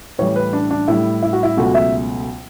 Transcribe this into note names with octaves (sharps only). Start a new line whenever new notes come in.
A2 E3 G3 C#5
B4
D4
D4
A2 G3 E4
E4
F#4
E4
C#2 B2 F#3 A3 F#4
E5